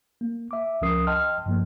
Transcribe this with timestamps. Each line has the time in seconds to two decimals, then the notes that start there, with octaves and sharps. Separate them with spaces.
0.21 A#3
0.51 E5 D6
0.82 C#2 F3 C#4 A#4 D#6 C7
1.07 D#5 G5 A5 C6 F6
1.46 G2 F3 A#3